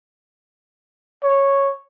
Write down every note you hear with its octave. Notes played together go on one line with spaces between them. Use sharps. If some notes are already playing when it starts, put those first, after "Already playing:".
C#5